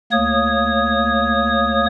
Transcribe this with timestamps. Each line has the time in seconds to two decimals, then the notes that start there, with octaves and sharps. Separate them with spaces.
0.12 D2 A#3 C#5 D#6